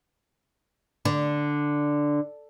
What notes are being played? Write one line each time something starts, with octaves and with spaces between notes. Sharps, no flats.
D3